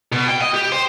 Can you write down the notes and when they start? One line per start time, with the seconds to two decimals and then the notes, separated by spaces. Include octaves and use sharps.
0.12 B2
0.28 G5
0.41 D#5
0.54 G4
0.72 C5